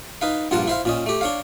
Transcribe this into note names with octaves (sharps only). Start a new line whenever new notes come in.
D#4 B4 F5
A#1 G2 F4 F#5 A5 A#5
E4 C5 F5
A#2 C#4 D#5
A3 G4
D4 C#5 F5